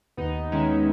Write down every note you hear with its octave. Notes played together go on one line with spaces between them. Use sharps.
D#2 B3 D#4
D#3 G#3 C#4 E4